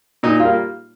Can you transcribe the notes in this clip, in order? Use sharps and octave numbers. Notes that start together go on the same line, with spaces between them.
A#2 D#4
G3 A#3 F4